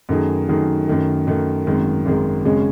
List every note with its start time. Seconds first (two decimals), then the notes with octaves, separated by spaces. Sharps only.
0.09 F#2 D#3 A3 D#4 G#4
0.49 F#2 D#3 A3 D#4 G#4
0.88 F#2 D#3 A3
1.27 F#2 D#3 A3
1.67 G#1 F#2 D#3 G#3
2.05 G#1 F#2 D#3 G#3
2.45 G#1 F#2 C#3 G#3 C#4